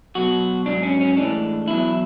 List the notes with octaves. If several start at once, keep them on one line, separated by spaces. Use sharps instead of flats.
B2 F#3 F#4
G#2 F#3 D4
C#4
C#4
A2 E3 G#3 D4
E2 B2 F#3 E4